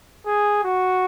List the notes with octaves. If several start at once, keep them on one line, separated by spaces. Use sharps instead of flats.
G#4
F#4